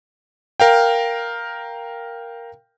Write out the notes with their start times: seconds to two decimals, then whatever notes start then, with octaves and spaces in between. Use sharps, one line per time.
0.60 A#4 F5 G5